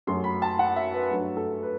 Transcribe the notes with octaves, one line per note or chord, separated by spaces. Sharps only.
F#2 F#3 A3 C6
B5
A5
F#5
E5
B4
G2 F#3 A3
A4
B4